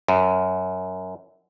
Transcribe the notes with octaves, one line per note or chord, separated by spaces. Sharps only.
F#2